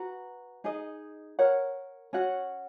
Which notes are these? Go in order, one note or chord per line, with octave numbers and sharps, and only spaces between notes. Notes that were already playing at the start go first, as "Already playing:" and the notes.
Already playing: F#4 B4 A#5
D#4 G#4 D#5
A#4 C#5 F#5
C#4 F#4 C#5 F#5